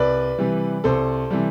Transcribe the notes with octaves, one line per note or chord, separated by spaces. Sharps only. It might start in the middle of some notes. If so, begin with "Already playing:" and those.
Already playing: C2 B4 D5
C3 E3 G3
C2 A4 C5
C3 E3 G3